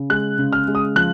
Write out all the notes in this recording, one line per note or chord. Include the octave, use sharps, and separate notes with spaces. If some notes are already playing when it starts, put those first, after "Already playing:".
Already playing: C#3
G#3 F#6
C#3
F6
G#3
D#6
F3 F#6